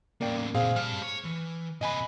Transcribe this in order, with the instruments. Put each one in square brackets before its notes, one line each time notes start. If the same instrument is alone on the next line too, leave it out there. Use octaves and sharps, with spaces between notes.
[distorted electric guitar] A2 C#3 [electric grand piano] A#3 D5 G5
[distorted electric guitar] A#2 C#3 [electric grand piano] C4 G#4 F5
[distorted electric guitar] G3 A5 [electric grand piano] F6
[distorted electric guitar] C#5
E3
[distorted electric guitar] C3 B4 [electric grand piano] D#5 G#5 B5